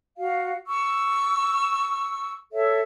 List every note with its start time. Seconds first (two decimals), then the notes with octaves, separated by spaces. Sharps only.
0.18 F#4 F5
0.66 C#6 E6
2.52 A4 C#5 E5